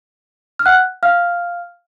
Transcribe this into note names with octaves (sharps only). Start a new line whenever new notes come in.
F6
F#5 F#6
F5 F6